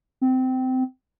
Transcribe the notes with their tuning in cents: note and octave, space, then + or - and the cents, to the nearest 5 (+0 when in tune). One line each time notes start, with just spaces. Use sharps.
C4 -20